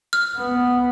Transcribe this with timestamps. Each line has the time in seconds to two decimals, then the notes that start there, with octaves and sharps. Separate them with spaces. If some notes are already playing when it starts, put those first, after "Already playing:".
0.13 F6
0.37 B3